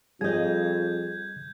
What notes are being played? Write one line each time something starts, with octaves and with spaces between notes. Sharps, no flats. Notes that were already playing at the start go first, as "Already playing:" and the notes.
F2 G3 G#4 D#5 G6 G#6